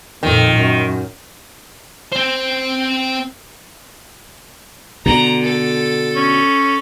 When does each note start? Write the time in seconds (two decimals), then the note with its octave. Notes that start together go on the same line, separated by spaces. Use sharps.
0.23 F2 A#2 D#3
0.56 F#2
2.12 C4 C5
5.06 B2 D3 A#5
5.43 A4
6.16 C#4